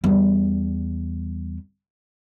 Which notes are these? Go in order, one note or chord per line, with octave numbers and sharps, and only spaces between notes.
E2 G3